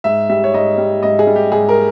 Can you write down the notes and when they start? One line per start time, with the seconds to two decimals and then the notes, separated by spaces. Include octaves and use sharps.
0.04 G#2 E5
0.29 G3 E5
0.44 C#5
0.54 G#2 D#5
0.78 G3
1.03 G#2 D#5
1.19 G#4
1.27 G3
1.36 G4
1.52 G#2 G#4
1.69 A#4